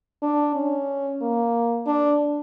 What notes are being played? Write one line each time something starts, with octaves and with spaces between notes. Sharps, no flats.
D4
C#4
A#3
D4